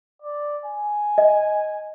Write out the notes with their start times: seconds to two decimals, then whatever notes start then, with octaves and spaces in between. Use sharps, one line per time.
0.22 D5
0.65 G#5
1.18 D#5